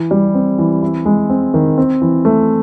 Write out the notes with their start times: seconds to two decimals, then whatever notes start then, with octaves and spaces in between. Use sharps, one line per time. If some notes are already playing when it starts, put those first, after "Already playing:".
Already playing: E3
0.11 G3
0.34 C4
0.58 E3
0.82 E4
1.06 G#3
1.30 C4
1.54 D#3
1.78 C4
2.02 E3
2.25 A3